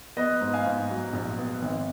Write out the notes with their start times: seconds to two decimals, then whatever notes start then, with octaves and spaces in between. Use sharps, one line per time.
0.17 B3 B4 D#5
0.41 G#2
0.53 F5 G#5
0.66 G#2
0.90 F#3
1.13 A#1
1.38 B3
1.62 G#1